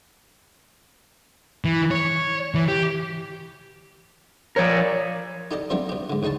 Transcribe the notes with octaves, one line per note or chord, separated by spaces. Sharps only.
E3
C#5
E3
G4
F3 A#4 C#5 D5
D#4 G4 A4 D5 D#5
F3 G3 A3 B3 C4 D4
B2 G4
G#2 D3
A1 C#3 D#4 C#5 A5